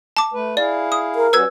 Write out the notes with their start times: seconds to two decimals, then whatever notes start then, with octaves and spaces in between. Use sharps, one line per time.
0.17 A5 D6
0.34 A3 B4
0.57 E4 G#4 D5 F5
0.92 D#6
1.15 A#4
1.33 G3 C#4 F#4 B4 E6 G#6